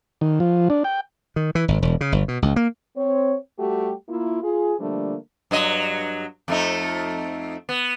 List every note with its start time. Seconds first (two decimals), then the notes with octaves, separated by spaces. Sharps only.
0.21 D#3
0.40 F3
0.70 D4
0.84 G5
1.36 D#3
1.55 E3
1.68 G#1
1.82 E1
2.01 C#3
2.12 G1
2.28 B2
2.42 C#2
2.56 A#3
2.97 C4 C#5
3.59 G3 A3 F#4 G4
4.09 A#3 E4 F4
4.43 F4 G#4
4.80 D3 F3 G3 A3 A#3 D4
5.51 G2 F#3 D#5
6.48 F2 A3 D#4
7.69 B3